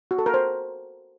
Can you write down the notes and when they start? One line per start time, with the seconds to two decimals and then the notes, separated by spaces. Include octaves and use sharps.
0.11 F#4
0.18 A4
0.26 A#4
0.34 C5